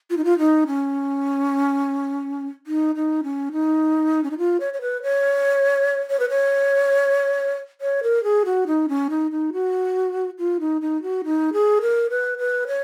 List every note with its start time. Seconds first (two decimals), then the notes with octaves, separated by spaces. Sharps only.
0.10 F4
0.17 D#4
0.25 F4
0.39 D#4
0.67 C#4
2.67 D#4
2.95 D#4
3.23 C#4
3.52 D#4
4.23 C#4
4.31 D#4
4.38 F4
4.60 C#5
4.74 C#5
4.81 B4
5.03 C#5
6.10 C#5
6.20 B4
6.30 C#5
7.81 C#5
8.03 A#4
8.24 G#4
8.45 F#4
8.67 D#4
8.89 C#4
9.10 D#4
9.31 D#4
9.53 F#4
10.39 F4
10.60 D#4
10.81 D#4
11.03 F#4
11.24 D#4
11.53 G#4
11.81 A#4
12.10 B4
12.38 B4
12.67 C#5